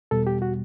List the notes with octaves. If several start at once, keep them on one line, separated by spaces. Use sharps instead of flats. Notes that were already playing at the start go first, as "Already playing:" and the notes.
E2 B2 G3 A4
G4
F#4